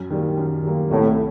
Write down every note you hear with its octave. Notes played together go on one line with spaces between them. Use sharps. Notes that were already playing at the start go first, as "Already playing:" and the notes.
Already playing: F#2
D#3 G3 A#3
F#2
D#3 G3 A#3
C2 A2